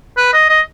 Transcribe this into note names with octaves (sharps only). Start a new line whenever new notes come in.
B4
D#5
D#5